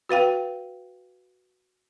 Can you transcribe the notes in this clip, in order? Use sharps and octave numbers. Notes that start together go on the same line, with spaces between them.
F#4 B4 F5 G5